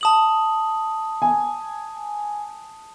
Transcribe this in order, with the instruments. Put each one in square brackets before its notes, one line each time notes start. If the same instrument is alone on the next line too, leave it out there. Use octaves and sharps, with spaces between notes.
[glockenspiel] A5 D#6 F#7
[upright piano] G#5